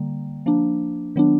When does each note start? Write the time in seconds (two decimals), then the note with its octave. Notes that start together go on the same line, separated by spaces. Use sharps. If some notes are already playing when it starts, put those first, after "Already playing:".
Already playing: D3 G3 A#3
0.46 F3 A#3 D4
1.16 D#3 F#3 B3 D4